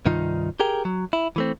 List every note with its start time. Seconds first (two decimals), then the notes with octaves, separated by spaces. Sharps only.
0.06 C2 G2 D#3 D#4 F4
0.60 G4 G#4 A#4 G5
0.85 F#3
1.13 E4
1.36 E3 A3 C4